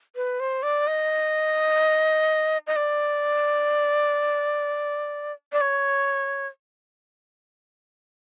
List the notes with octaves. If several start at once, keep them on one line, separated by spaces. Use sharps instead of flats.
B4
C5
D5
D#5
D#5
D5
D5
C#5